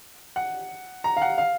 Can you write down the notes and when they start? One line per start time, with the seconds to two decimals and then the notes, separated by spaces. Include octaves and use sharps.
0.36 F#5
1.04 A#5
1.17 F5
1.22 F#5
1.38 F5